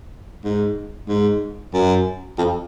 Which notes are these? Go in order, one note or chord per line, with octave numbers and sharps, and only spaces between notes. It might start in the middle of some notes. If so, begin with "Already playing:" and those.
G#2
G#2
F#2
F2